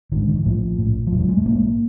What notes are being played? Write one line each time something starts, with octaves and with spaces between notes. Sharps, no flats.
G#1 G#2 D3 D#3
D#3
E3
A#1 A2 F3
A#1 A2
F3
F#1 E2 B2 F#3
G3
G#3
A3
A#1 G#2 A#3